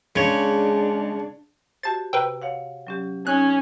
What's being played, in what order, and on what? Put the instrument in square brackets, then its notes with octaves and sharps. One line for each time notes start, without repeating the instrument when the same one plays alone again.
[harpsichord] C#3 C#5 [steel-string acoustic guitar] G#3 [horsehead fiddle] D4
[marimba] F#4 G4 C5 [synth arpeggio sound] A5 A6
[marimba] C3 A#5 [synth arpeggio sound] B4 C5 G5
[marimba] C#5 F5 F#5
F#3 C#4 G4
[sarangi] C#4 [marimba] D#4 [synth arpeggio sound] F#6